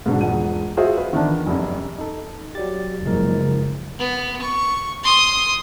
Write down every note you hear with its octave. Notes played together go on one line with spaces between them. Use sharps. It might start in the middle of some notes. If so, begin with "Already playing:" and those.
G#2 B2 D3
E1 F3 F#5 D#7
F4 F#4 G#4 C5 E5
F4 B4
D#3 E3 B3 D4
F1 F#2
D#4 A4
F#3 G4 D5 A6
F#1 F3 G#3 A#4
B3
C#6
C6 D#6